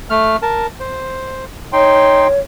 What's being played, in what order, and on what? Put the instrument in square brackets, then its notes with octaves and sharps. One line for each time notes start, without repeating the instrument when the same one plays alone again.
[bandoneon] A3 F6
A#4 A5
C5
[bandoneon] D#4 G5 C6 [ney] C#5